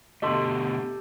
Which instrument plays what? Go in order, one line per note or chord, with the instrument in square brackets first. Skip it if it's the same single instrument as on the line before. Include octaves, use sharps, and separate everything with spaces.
[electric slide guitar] B2 D3 A3 [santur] G4 A4 [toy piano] D#5 F5 C6